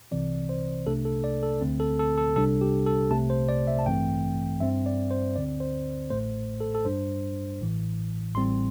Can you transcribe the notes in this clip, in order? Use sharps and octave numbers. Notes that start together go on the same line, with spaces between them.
C2 C3 E3 C4 D5
C5
C2 C3 A3 D4 A4
A4
D5
A4
D2 D3 A3 C4
A4
A4
A4
C2 C3 G3 D4 A4
G4
A4
C2 C3 A3 A5
C5
D5
E5
A5
A1 G2 E3 A3 C4 G5
G2 G3 C4 E5
D5
C5
D2 D3 C4 D5
C5
A1 A2 A3 C5
A4
A4
G2 G3 D4 C5
A1 A2 E3
A1 A2 G3 C4 C6